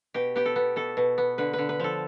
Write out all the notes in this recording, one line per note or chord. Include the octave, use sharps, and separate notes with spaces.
B2 G4
B3 G4
A4
B3
B2 A4
B2
B3
D3 B4
B4
D3
B4
F3 A4